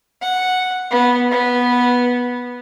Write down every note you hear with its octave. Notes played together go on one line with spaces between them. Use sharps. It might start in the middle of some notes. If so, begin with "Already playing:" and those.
F#5
B3
B3